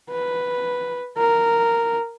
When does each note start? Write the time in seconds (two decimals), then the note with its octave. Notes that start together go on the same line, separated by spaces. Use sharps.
0.10 B4
1.17 A#4